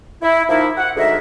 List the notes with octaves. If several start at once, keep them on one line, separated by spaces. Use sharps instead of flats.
E4
F3 A#3 D#4 E4
F#5
D2 G#2 G#4 A#4 E5